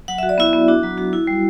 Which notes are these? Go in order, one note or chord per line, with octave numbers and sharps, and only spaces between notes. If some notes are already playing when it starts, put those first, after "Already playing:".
F#3 F#5
F#4 E5
D5
B3 E4 E5
B3
D4 F#4
F#3
F#4
E4
G3